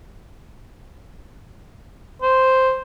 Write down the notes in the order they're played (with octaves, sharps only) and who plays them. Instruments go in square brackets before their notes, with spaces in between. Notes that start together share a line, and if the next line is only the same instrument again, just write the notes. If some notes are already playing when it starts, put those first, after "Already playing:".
[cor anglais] C5